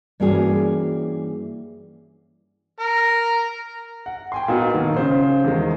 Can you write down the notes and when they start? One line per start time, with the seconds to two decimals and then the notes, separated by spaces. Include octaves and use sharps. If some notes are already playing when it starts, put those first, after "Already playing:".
0.20 G2 E3 A#3 C#4 F#4 G#4
2.80 A#4 A#5
4.06 F#5
4.32 G5 G#5 C6
4.48 A#2 B3 D#4 F#4
4.74 B1 D#3
4.97 C#3 C5
5.44 E2 D#3 G#3